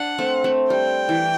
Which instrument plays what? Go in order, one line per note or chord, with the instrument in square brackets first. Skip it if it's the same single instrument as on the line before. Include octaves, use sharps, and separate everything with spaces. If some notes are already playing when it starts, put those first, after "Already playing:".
Already playing: [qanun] D4 [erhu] F#5
[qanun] A3 C4
A3 C4
[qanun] G3 [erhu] G5
[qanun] E3